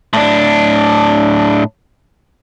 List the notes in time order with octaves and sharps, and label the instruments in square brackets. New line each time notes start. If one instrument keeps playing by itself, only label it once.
[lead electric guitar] A2 D4